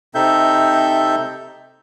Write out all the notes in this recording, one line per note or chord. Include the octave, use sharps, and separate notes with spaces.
C3 C4 D#4 A4 E5 G6